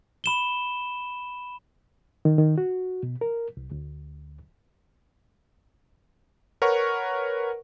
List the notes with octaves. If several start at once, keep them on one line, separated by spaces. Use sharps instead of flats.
B5 E7 G7
D#3
D#3
F#4
B2
A#4
C2
D2
A#4 B4 C#5 F#5 C#6